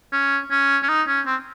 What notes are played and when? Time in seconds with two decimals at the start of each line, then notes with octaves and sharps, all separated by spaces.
0.13 C#4
0.51 C#4
0.83 C#4
0.89 D#4
1.07 C#4
1.26 C4